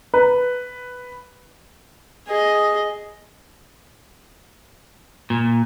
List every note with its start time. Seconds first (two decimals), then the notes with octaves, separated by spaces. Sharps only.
0.14 B4
2.28 G#4 D#5
5.30 A#2